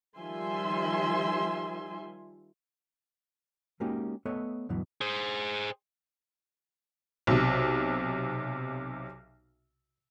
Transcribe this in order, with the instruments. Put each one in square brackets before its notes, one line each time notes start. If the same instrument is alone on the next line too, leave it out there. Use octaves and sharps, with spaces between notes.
[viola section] D#3 F3 G3 E5 G#5 C6
[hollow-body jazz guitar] G#3 A#3 C#4 D#4 F#4 G4
A3 B3 A4 C#5 D#5
D2 G2 B2 E3 F#3
[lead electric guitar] G#4 C5
[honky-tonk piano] B1 C3